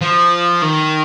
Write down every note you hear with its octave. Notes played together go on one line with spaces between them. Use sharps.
F3
D#3